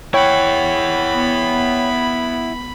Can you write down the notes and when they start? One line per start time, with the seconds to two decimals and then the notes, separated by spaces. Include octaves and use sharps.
0.14 E4 C#5 F#5 G5 B5
1.13 B3